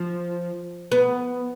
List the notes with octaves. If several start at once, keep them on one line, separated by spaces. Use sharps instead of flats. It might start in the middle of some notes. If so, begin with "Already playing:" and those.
Already playing: F3
B3